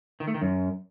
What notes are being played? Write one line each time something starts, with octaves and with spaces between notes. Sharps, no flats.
D#3
A3
D#3
F#2